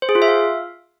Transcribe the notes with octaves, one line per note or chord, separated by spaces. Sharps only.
C5
G#4
F4
E5
F5